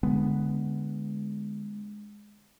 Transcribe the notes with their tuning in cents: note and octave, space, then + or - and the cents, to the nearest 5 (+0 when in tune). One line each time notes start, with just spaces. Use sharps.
D3 +0 G#3 +0 B3 +0